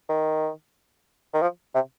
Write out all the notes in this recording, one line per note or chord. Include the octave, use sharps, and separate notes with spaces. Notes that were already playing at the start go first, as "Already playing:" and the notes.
D#3
D#3
F3
C3